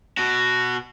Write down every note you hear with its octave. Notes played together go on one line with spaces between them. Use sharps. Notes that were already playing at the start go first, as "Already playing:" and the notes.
B2 F#4